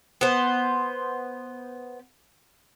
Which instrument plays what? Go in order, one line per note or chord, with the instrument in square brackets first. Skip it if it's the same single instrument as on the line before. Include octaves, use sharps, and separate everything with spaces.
[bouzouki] B3 C5